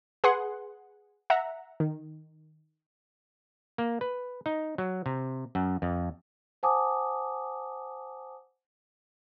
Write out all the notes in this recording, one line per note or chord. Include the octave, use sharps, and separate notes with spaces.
G#4 B4 F#5 C6
E5 F#5 A#5
D#3
A#3
B4
D#4
F#3
C3
F#2
F2
C5 F#5 G#5 A5 D6 D#6